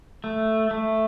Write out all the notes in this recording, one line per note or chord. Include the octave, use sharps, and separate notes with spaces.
A3
A3